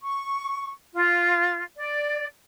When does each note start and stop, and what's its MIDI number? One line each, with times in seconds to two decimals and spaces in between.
0.01 0.69 85
0.94 1.63 65
1.76 2.26 74